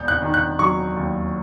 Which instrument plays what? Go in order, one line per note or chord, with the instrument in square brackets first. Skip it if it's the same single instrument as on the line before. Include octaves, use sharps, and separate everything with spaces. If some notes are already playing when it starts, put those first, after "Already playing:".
Already playing: [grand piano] E1 G6
F#6
D#3
F#6
F#3 C#6
D#2